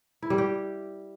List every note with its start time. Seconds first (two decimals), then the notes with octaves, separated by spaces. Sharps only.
0.22 E4
0.30 G3
0.38 G4